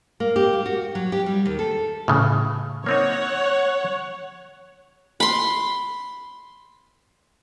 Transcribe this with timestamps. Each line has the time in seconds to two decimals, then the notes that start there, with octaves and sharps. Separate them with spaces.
0.20 A#3
0.36 G4
0.53 A#3
0.66 F#4
0.95 F#3
1.12 G4
1.26 G3
1.46 D#2
1.59 A4
2.08 A2 C#3 E3
2.86 A#3 C4 D#4 C#5 F#5
5.20 B5 C6